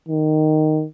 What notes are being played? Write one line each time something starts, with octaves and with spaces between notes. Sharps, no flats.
D#3